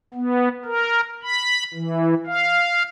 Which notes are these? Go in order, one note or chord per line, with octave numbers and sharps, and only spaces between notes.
B3
A#4
B5
E3
F5